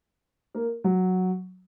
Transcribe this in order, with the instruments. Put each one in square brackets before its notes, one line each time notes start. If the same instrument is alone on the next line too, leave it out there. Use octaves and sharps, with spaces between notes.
[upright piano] A#3
F#3